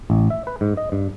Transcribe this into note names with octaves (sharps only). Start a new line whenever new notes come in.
A1
E5
B4
G#2
D#5
G2